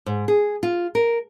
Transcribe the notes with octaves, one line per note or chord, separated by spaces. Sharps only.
G#2
G#4
F4
A#4